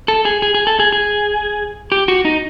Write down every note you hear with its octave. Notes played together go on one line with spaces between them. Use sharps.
A4
G#4
G#4
G#4
A4
G#4
G#4
G4
F#4
D#4